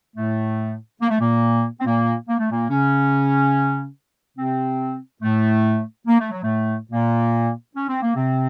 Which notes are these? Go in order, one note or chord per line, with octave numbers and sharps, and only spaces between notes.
A2 A3
A#3
A3
A#2 A#3
C4
A#2 A#3
A#3
A3
A#2 A#3
C#3 C#4
C3 C4
A2 A3
A#3
A3
F#3
A2 A3
A#2 A#3
C#4
C4
A#3
C3 C4